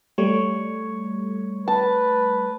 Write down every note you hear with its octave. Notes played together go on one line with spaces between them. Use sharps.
G3 A3 C#5
B4 A5